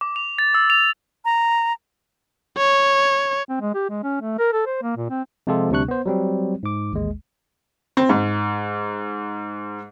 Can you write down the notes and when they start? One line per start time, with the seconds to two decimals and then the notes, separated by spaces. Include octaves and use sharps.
0.01 D6
0.16 F7
0.39 A6
0.54 E6
0.70 F7
1.25 A#5
2.57 C#5
3.49 C4
3.61 G#3
3.74 G4
3.89 G#3
4.03 C#4
4.22 A3
4.39 A#4
4.53 A4
4.66 C5
4.82 A#3
4.97 A#2
5.10 C4
5.47 C3 F3 G#3 F4 G4 A4
5.70 D2 C3 G3 D4 C#6 F#6
5.88 B3 C5
6.06 F#3 G3 C4
6.63 G#2 D6
6.92 A1 D#2 G#3
7.97 C4
8.09 G#2